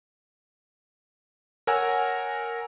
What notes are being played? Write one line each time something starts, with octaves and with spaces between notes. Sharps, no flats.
A#4 C#5 F#5 G#5 E6